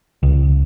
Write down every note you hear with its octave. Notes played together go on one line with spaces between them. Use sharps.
C#2